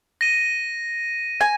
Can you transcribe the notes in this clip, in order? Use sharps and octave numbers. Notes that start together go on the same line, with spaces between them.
A#6 D#7
G#5